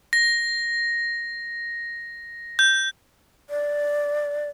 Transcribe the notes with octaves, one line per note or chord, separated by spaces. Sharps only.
A#6
G6
D5